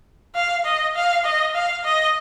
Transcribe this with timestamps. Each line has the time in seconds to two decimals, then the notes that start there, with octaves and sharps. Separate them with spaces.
0.35 F5
0.65 D#5
0.96 F5
1.25 D#5
1.55 F5
1.85 D#5